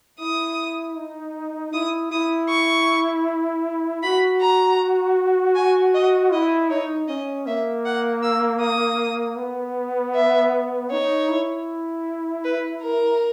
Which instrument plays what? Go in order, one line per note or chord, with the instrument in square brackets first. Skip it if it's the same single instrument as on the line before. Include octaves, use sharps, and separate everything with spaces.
[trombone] E4 [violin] D#6
[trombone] D#4
[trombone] E4 [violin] D#6
[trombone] E4 [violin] D#6
[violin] C#6
[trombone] F#4 [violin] B5
[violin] A#5
G#5
D#5
[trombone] E4 [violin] D#5
[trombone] D#4 [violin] C#5
[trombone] C#4 [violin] D#5
[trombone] A#3 [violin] E5
[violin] F#5
E6
D#6
[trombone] B3
[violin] E5
[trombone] D#4 [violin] C#5
[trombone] E4
[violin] B4
A#4